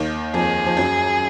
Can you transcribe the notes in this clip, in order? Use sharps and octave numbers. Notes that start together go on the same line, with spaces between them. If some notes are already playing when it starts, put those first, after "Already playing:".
Already playing: D#2 D#3
F2 F3 G#4
F3
F#2 F#3